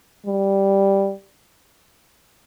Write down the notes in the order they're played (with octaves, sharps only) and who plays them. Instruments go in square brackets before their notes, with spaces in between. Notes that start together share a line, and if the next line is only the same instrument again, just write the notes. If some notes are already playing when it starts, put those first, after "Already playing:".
[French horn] G3